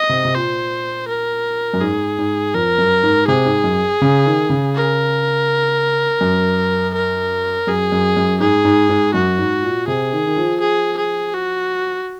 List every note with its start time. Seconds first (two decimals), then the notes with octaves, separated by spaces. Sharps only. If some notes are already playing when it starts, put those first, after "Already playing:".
Already playing: D#5
0.10 C3
0.25 C3
0.35 A#2 C5
1.08 A#4
1.74 F#2
1.81 G#2 G#4
2.18 G#2
2.55 F2 A#4
2.78 F#2
3.03 G#2
3.28 C3 G#4
3.45 G#2
3.64 F#2
4.02 C#3
4.25 D#3
4.50 C#3
4.74 A#4
6.21 F#2
6.94 A#4
7.67 F#2 G#4
7.92 F#2
8.17 F#2
8.40 G#2 G#4
8.65 G#2
8.89 G#2
9.14 F#2 F#4
9.38 G#2
9.62 A#2
9.88 C3 G#4
10.12 D#3
10.26 D#3
10.36 F3
10.60 G#4
10.97 G#4
11.34 F#4